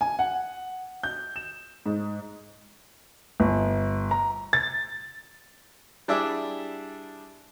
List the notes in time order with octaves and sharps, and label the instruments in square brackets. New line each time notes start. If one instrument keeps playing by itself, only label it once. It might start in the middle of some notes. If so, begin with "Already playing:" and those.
[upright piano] G#5
F#5
G6
E7
G#2
[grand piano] G1
A#5
A6
[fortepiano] G3 D4 E4 G#4 E5